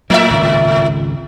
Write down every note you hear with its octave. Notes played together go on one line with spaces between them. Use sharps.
A2 F#3 A#3 E5
G#1 C#2